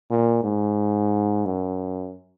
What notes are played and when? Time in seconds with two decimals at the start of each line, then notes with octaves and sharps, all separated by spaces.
0.11 A#2
0.44 G#2
1.45 F#2